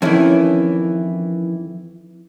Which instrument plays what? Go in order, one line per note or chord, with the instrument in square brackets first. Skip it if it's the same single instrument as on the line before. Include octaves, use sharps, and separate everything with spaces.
[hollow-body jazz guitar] F2 D#3 [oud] E3 C#4 E4